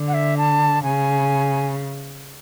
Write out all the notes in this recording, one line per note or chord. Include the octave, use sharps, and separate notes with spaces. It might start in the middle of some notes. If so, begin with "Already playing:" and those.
Already playing: D3
F#5
E5
A5
C#3 G#5